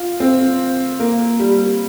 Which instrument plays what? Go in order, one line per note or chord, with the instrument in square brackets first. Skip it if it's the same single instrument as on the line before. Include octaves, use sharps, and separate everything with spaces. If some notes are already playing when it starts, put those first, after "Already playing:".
Already playing: [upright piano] F4
C4
A#3
G3